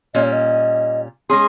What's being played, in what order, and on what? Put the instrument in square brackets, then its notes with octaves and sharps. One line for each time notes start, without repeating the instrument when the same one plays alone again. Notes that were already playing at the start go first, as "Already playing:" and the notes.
[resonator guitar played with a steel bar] A#2 G3 C#4 [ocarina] D#5
[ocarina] C#5
D#5
[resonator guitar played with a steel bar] G#3 C#4 G#4 [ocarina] C6